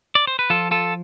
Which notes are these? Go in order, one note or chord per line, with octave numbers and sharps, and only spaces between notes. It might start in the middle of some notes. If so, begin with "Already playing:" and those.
D5
C5
B4
F3 F4 A4
F4 A4